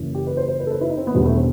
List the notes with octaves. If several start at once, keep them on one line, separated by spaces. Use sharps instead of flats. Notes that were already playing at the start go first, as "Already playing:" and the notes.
Already playing: F#1 F#2 E3
G4
B4
C5
C5
B4
A4
B4
E4
D#4
C4
B3
E1 E2 D#3 G3
A3
C4